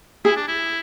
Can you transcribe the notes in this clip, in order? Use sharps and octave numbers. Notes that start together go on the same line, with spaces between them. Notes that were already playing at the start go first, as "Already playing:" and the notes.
E4 G#4
D4
E4